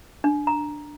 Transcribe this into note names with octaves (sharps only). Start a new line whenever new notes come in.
D4
A#5